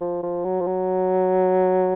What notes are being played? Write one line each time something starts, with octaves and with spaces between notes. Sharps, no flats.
F3
F3
F#3
F3
F#3